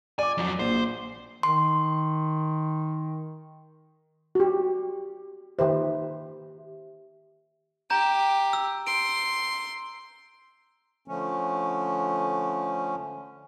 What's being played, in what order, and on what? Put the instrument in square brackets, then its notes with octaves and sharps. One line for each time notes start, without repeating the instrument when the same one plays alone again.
[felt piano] D5 D6 [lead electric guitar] G#5
[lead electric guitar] F2 F#3
[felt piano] A#1 [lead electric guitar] C5
[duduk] D#3 [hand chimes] C6
[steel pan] F#4 G4
[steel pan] D#3 B4 C5 [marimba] G4 E5
[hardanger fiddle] G4 [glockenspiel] A#5 G6
[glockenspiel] E6
[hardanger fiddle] C6 [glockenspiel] D7
[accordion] D3 F3 A3 C#4